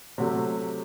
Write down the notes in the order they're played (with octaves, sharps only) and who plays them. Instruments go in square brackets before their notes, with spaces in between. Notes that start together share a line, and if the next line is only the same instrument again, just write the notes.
[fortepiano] C3 F#3 A3